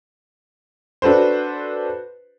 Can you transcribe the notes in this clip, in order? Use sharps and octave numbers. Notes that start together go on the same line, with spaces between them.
D4 F#4 A4 B4 C5